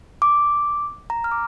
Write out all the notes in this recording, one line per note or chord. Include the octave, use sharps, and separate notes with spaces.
D6
A#5
F6
D6